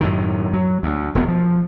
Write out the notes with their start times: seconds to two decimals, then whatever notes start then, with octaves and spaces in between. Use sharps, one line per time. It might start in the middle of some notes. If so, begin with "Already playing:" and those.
0.01 F#2 A2 D#3
0.53 F#3
0.83 D2
1.15 E1 E2 C3 B3
1.28 F3